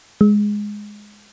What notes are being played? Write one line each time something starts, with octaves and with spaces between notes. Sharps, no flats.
G#3